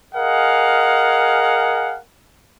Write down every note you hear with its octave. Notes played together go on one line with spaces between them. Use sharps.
G#4 A#4 D#5 F5 F#5 G#5